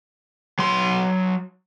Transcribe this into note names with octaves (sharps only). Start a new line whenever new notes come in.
F#3 C6